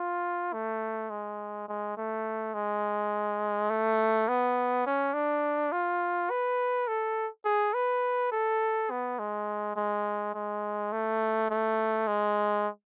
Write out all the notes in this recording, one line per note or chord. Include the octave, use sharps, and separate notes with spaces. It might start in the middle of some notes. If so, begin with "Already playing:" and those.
Already playing: F4
A3
G#3
G#3
A3
G#3
A3
B3
C#4
D4
F4
B4
A4
G#4
B4
A4
B3
G#3
G#3
G#3
A3
A3
G#3